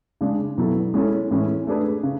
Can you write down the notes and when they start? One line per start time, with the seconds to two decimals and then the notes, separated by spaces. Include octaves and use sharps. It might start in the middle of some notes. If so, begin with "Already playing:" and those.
0.21 C#3 G#3 D4
0.58 B2 F#3 B3 E4 A4
0.94 G#3 C#4 E4 A4 C#5
1.31 A2 E3 G#3 C#4 E4
1.67 A3 D4 G#4 B4
2.03 C#3